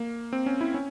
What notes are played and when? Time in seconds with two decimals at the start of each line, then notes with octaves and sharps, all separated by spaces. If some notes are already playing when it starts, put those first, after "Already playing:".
Already playing: A#3
0.33 C4
0.46 C#4
0.61 E4
0.74 C#4